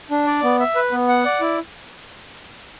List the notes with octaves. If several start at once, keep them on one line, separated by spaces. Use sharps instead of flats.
D4
D5
B3
E5
B4
B3
F#5
D5
E4